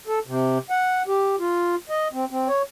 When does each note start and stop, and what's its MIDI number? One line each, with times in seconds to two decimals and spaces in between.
0.07 0.19 69
0.27 0.58 48
0.70 1.03 78
1.07 1.36 67
1.39 1.75 65
1.89 2.08 75
2.13 2.25 60
2.31 2.48 60
2.48 2.62 73